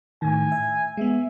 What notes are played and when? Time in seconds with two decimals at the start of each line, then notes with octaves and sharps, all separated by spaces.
0.22 A2 D#3 G#5
0.52 E5
0.97 G#3 B3 E5